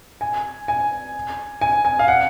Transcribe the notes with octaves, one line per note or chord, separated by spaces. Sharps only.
G#5
G#5
G#5
G#5
F5
F#5